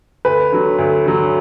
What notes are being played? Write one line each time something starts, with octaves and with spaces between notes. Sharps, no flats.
D2 B4
D3 F#3
D2
D3 F#3